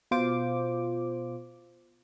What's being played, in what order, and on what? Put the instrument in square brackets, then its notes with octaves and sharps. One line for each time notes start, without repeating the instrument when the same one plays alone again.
[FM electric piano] B2 F4 C5 D6